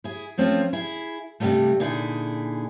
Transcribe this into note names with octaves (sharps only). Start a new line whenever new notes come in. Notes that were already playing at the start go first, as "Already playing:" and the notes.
E4 G#4
F3 A3 C4 C#4 F4
E4 G#4
G2 C3 E3 F#3 G3 A3
A#2 D3 D#4 E4 G#4